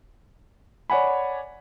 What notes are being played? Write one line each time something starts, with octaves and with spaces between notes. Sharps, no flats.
C#5 D5 F#5 G#5 B5